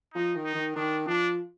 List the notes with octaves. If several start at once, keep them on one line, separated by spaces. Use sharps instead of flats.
F3 D#4
D#3
D#4
D#3
D#3 D4
F3 D4